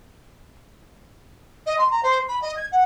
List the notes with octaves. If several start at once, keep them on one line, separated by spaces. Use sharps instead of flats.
D#5
C6
A#5
C5
B5
D#5
G#6
F#5